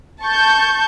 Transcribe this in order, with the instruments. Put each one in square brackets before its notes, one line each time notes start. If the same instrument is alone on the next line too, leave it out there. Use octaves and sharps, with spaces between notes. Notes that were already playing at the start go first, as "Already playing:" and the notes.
[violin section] A5 C#6 G6